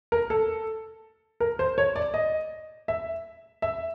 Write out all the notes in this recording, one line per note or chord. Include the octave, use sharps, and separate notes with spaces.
A#4
A4
A#4
C5
C#5
D5
D#5
E5
E5